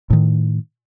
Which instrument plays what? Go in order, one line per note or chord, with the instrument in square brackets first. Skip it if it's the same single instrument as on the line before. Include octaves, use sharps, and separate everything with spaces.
[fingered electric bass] A2 D#3